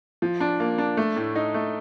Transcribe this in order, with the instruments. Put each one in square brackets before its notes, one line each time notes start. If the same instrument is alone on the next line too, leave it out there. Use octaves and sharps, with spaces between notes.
[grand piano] F3
D4
A#3
D4
A3
A2
D#4
A3